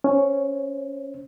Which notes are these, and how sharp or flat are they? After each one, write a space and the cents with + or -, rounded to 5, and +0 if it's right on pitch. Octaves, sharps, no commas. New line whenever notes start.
C#4 +0 C5 +15